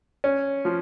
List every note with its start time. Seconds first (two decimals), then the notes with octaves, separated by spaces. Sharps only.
0.24 C#4
0.65 F3